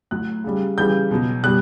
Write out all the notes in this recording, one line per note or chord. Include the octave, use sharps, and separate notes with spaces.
A2 F#3 F#6
C#3 G3
C#3 E3 G3 G6
B2 F#3
B2 G3 F#6